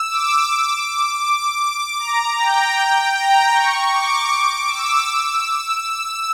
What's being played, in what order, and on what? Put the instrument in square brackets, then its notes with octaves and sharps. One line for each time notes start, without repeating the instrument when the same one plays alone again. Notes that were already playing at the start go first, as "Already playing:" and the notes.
Already playing: [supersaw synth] E6
D6
D6
A#5
G5
G5
A#5
C#6
D6
D6
E6
E6